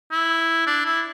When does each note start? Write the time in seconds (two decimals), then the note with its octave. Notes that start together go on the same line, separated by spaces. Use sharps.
0.11 E4
0.67 D4
0.85 E4